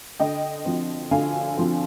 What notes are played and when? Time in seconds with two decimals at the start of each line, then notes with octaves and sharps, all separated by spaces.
0.20 D3 D#5 G5
0.65 F3 C4
1.11 D3 F5 G#5
1.57 F3 C4